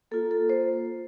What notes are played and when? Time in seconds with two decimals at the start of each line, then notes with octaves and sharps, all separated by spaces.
0.11 A#3 F4 A4
0.31 A4
0.49 C5